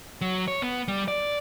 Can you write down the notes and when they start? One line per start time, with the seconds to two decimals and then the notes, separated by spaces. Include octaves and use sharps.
0.21 F#3
0.48 C#5
0.62 B3
0.88 G3
1.08 D5